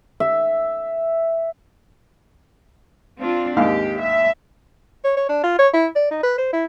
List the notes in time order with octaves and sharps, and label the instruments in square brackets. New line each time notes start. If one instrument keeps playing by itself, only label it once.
[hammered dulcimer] E5
[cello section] C4 D4 F4
[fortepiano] D#2 G#2 F5 [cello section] G4
[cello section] E5
[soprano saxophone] C#5
C#5
D4
F4
C#5
E4
D5
D#4
B4
C5
E4